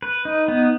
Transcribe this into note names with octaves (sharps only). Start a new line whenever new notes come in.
B4
D#4
B3